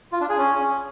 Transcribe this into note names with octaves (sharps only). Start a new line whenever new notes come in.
F4
D4
G#4
C#4